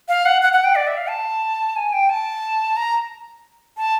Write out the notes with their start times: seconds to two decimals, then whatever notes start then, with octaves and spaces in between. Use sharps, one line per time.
0.08 F5
0.25 F#5
0.42 F#5
0.53 F#5
0.64 G5
0.75 D5
0.87 E5
0.97 F5
1.09 A5
1.76 G#5
1.93 G5
2.09 A5
2.76 A#5
3.77 A5